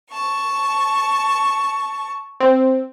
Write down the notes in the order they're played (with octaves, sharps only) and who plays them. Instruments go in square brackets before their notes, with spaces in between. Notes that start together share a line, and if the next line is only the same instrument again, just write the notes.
[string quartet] A5 C#6
[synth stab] C4